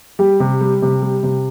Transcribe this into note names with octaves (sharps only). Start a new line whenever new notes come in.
G3 G4
C3
G3
C3
G3
C3